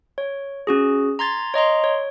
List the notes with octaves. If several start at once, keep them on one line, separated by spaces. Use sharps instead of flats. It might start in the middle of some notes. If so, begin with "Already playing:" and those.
C#5
C#4 F#4 G#4
A#5 C6 G#6 A6
C#5 D#5 A#5 C6
C#5